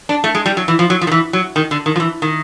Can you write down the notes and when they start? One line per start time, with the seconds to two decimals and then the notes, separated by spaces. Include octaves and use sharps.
0.09 D4
0.24 A3
0.35 G#3
0.46 G3
0.57 F#3
0.68 E3
0.79 F3
0.90 F#3
1.01 F3
1.07 D#3
1.12 E3
1.33 F#3
1.56 D#3
1.71 D3
1.86 D#3
1.96 F3
2.00 E3
2.22 D#3